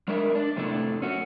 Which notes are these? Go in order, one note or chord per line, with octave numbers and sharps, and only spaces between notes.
G3 G#3 D4 A#4 E5
D4 D5
F2 A2 C3 A3 D4 E4
C#4 F#4